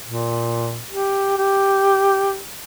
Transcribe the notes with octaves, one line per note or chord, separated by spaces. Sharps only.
A#2
G4
G4